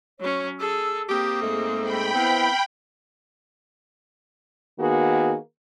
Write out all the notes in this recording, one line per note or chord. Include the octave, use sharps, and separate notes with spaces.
F#3 C#4 C#5
G#4 A4 E6
A#3 C4 G4 D#6
G#2 G#3 A3
G5 B5
B3 C4 E4 F5
D#3 A#3 B3 F#4 G#4